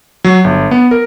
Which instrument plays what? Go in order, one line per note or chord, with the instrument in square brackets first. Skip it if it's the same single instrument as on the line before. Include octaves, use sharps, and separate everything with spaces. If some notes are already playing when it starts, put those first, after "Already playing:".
[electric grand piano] F#3
G1
B3
A#4